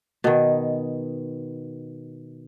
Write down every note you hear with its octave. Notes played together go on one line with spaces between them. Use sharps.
B2 D#3